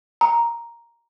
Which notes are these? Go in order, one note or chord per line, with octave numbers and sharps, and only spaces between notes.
A#5